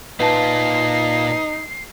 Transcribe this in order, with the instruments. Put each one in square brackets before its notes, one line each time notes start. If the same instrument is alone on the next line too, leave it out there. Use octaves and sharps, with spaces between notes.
[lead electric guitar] A#2 F4 [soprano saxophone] D#4 [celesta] B4 A5 [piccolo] C7